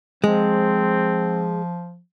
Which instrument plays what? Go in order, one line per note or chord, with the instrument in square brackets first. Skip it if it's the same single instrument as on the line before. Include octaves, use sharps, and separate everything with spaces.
[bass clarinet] F3 [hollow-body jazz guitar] G#3 [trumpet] C4